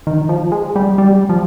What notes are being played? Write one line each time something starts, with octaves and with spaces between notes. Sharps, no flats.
D#3
F3
G#3
G3
G3
F3